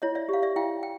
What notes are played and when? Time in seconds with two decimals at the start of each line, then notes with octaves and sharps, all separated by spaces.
0.02 E4 C#5 D#5
0.15 D5 E5
0.29 G4 F5
0.42 D5 E5
0.56 E4 F5 G5
0.83 G5